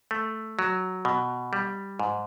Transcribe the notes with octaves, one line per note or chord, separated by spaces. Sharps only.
A3
F#3
B2
G3
G#2